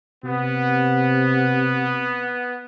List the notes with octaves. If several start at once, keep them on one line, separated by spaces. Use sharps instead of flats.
C3 B3